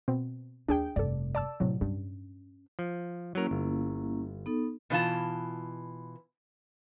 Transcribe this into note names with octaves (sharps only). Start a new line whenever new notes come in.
B2 C4
D#2 D4 G#4 G5
F1 G2 A4 D5
D5 A5 E6
A2 C3 F#3
G2 C#4
F3
F#3 A#3 C#4 E4 A#4
G1
B3 D#4 A4
B2 E3 F4 A5